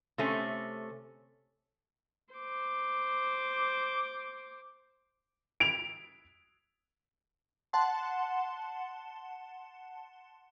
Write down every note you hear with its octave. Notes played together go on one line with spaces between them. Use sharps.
C3 A3 C#4
C5 D6
D7 F7
F#5 A5 C6